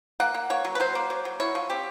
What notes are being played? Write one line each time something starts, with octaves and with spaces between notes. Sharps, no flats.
A#3 F#5
A#3
A#3 C#5
F#3
B4
F#3 C5
A#3
F#3
F#3
E4 C#5
F3
C4 G4